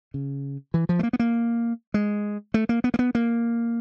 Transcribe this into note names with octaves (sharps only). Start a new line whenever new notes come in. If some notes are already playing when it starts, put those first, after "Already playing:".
C#3
E3
F3
A3
A#3
B3
A#3
G#3
A3
A#3
B3
A#3
B3
A#3